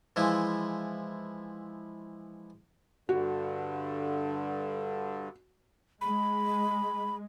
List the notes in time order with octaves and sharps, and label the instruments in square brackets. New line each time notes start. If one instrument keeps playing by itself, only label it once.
[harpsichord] E3 F3 G#3 E4
[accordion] G2 D3 [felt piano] F#4
[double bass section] G#3 [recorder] B5